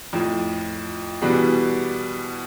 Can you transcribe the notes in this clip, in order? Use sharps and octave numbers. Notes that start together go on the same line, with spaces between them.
F2 A2 F3
B2 E3 G3 B3 D4 G#4